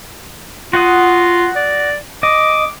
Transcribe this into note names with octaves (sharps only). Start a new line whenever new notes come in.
F4 F#4 F#5 D#6
D5
D#5 D6